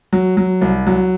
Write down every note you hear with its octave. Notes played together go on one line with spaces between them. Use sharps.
F#3
F#3
C2
F#3